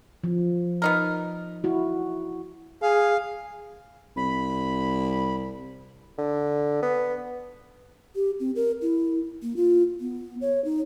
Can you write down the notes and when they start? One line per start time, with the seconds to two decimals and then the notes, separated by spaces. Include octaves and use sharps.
0.24 F3
0.82 B3 D#4 A#4
1.64 E4 F#4
2.82 G#4 F5
4.16 C2 B5
6.18 D3
6.83 B3
8.15 G4
8.40 C4
8.56 A#4
8.82 E4
9.42 A#3
9.56 F4
10.00 B3
10.41 C#5
10.64 D#4